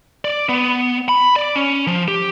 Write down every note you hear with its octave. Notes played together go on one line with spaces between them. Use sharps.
D5
B3
B5
D5
C#4
F3
G4